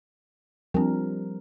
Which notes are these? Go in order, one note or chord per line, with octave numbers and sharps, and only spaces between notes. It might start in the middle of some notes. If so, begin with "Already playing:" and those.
F3 G3 C4 D4 A#4